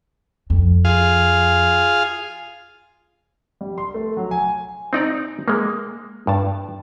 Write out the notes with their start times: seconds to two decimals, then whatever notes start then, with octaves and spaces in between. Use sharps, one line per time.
0.50 F2
0.85 F4 G#4 F5
3.61 G3
3.78 C6
3.94 A3
4.17 F#3
4.31 G#5
4.93 C4 D#4 D5 A#5
5.48 G#3 A#3
6.27 G2 A5